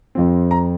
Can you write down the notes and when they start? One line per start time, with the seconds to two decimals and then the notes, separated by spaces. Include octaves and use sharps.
0.15 F2 F3 C4
0.51 A#5